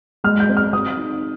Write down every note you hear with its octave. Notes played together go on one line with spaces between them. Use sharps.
G#3 F6
G6
C4
F6
C4 D#6
D#4